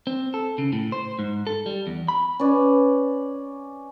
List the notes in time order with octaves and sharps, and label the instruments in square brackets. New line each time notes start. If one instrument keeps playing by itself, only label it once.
[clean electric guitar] C4
A4
C#3
A2
C5
G#2
A4
G3
E2
B5
[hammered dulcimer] C#4 B4 D5